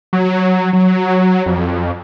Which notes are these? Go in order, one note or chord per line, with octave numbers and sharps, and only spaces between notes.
F#3
F#3
F2